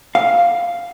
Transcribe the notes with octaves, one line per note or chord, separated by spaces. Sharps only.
F5